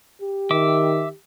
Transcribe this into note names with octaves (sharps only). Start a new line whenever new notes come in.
G4
D#3 E5 D6